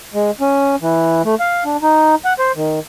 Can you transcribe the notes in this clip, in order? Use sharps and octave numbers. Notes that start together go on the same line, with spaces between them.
G#3
C#4
E3
A3
F5
D4
D#4
F#5
C5
D#3